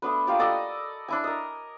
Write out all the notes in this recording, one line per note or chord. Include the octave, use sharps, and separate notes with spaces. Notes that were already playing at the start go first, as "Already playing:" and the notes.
A3 B3 D4 B4
A#3 F4 G4 D5
A4 D5 D#5 F#5
D4 E4 G#5
A#4 D#5